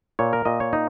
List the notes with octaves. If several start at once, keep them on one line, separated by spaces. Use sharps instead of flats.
A#2 C#5
A#4
A#2 D#5
C#5
D#4